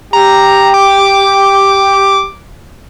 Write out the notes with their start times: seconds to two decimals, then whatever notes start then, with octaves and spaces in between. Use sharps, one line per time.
0.13 G4 A#5
0.74 D6